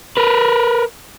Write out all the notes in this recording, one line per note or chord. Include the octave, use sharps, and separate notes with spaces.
A#4 B4